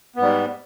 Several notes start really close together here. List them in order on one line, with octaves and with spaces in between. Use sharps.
B3 G#2 G3